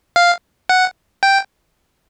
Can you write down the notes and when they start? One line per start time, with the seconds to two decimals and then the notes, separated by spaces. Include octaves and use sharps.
0.16 F5
0.69 F#5
1.23 G5